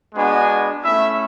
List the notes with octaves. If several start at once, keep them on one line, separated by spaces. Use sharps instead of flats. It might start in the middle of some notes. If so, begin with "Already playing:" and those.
G#3 B3 D4 F#4 G#5
A3 C#4 E4 E5